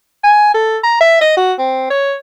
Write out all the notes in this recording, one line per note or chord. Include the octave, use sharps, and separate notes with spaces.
G#5
A4
A#5
E5
D#5
F#4
C4
C#5